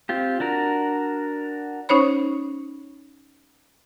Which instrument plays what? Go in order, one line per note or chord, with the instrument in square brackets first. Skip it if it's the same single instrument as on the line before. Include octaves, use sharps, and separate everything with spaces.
[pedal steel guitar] C4 F4 G4
D4 F#4 A#4
[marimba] C#4 D#4 C5 C#5 B5